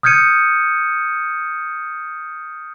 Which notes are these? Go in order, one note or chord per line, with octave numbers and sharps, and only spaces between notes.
D#6 F6 G6 G#6 C#7 D#7